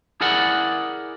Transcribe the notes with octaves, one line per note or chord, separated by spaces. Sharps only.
E4 G#4 A#4 D5 F#5